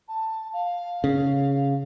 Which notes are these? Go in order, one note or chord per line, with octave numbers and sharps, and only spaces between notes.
A5
F5
C#3